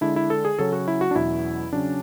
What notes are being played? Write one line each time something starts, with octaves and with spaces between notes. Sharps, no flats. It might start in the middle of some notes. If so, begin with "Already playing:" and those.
D3 G#3 D4 E4
E4
A4
G#4
C#3 F#3 C#4 A4
F#4
E4
F#4
D4
E2 B2 F#3 C#4 E4
C#3 F#3 C#4 D4